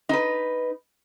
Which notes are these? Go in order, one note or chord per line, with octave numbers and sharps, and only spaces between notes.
D#4 B4